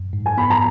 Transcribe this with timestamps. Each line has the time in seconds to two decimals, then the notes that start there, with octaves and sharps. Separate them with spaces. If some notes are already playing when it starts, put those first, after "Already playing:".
Already playing: F#2
0.13 G#2
0.26 G#5
0.38 B3 B5
0.50 A#5